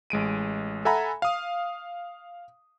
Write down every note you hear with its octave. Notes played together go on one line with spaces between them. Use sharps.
A1 G#3 D7 D#7
A4 E5 F#5 G#5 A#5 B5
F5 D#6